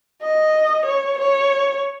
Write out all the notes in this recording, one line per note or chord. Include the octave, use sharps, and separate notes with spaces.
D#5
C#5
C#5